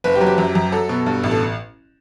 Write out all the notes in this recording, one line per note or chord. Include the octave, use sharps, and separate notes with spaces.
F#1 B4
G4
F#3
G4
F#2
F#2
F#3 A4
B2
G2
A1
A4